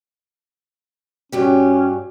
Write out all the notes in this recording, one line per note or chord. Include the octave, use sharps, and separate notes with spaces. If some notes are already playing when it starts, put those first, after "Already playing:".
G2 F#3 C#4 G4